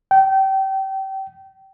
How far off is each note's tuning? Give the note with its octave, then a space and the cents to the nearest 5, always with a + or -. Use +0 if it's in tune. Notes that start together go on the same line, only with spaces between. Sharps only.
G5 -25